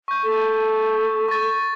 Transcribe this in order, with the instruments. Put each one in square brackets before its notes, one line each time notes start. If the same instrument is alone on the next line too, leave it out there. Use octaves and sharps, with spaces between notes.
[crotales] C#6 G6
[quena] A4
[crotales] C#6 A6